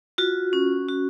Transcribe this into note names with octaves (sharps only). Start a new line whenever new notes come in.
F4 F#4
C#4
F#4